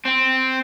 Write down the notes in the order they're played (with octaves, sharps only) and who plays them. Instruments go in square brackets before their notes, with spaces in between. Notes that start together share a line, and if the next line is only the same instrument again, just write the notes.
[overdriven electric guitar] C4